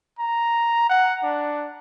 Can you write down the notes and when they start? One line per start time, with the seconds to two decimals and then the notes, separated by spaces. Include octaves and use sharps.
0.18 A#5
0.90 F#5
1.23 D4